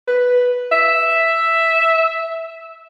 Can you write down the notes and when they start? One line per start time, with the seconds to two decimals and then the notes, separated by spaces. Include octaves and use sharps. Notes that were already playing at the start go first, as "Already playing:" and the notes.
0.07 B4
0.72 E5